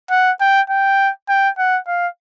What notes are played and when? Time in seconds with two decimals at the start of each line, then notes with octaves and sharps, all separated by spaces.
0.11 F#5
0.41 G5
0.70 G5
1.29 G5
1.58 F#5
1.87 F5